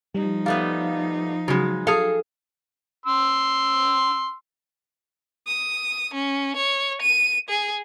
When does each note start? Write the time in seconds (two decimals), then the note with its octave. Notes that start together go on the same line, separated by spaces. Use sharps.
0.15 F3 G3 D#4
0.46 G3 A3 B3 F5
1.48 C#3 F#3 G#3 F#4
1.87 G#4 A4 F5
3.06 C6 E6
5.47 D#6
6.14 C#4
6.57 C#5
7.02 D#7
7.49 G#4